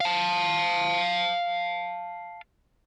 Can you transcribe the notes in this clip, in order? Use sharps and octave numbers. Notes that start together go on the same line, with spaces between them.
F5 A5